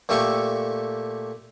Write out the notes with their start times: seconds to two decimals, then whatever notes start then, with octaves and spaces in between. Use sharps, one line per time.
0.09 A#2 A3 G4 A4 C#6